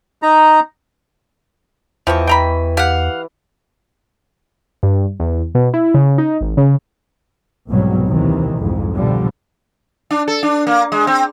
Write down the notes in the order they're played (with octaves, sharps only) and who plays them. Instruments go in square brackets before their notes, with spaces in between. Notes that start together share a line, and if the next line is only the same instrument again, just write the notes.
[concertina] D#4 A#5
[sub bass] E2 [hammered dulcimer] E3 [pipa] F3 [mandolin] G4 D#5 C#6
[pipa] G5 A#5 B5
[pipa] G4 [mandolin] F5 F#5
[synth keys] G2
E2
B2
E4
C#3
D#4
G#1
C#3
[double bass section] C2 G#2 B2 F#3 G3
D#2 C3 D#3 E3
C2 F2 G#2
B2 D3 F3 G3
[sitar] D4
A4
D4
A#3
G#3
C4